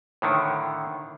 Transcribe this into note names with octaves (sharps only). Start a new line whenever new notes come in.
A2 D3 D#3